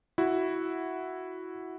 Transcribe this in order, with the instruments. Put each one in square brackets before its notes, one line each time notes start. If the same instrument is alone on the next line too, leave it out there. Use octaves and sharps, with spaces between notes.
[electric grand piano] E4 F#4